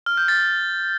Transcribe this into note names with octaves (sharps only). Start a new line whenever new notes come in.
F6
G6
A6